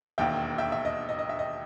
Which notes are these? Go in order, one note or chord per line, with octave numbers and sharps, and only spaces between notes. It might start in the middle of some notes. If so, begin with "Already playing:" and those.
E1 D#2 D#3 E5 G5
E5 G5
E5
D#5
D#5
D#5
E5
D#5